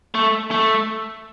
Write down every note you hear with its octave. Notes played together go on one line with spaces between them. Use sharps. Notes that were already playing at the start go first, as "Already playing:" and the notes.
A3
A3